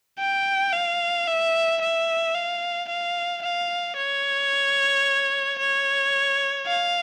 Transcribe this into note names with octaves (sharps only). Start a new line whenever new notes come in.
G5
F5
E5
E5
F5
F5
F5
C#5
C#5
F5